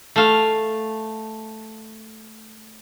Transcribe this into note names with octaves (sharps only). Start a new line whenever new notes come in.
A3 F5